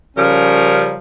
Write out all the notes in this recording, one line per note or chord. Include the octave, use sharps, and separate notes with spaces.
C#3 F3 G3 C#4 A#4